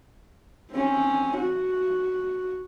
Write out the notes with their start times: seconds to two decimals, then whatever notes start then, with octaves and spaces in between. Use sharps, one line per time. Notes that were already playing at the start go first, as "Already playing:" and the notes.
0.72 C4 C#4
1.37 F#4